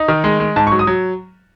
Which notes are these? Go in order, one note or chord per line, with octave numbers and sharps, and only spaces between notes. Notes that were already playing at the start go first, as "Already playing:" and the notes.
Already playing: D#4
D#3
G#3
G#3
G#2 A5
C#6
F#3
D#6
F#3